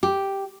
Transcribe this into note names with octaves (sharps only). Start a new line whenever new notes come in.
G4